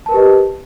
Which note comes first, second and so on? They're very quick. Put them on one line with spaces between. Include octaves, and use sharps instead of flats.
A5 A#4 B4 G4 D#5